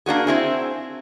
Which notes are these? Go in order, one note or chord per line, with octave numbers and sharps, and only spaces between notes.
A#3 D4 F#4 G#4
C4 E4 G#4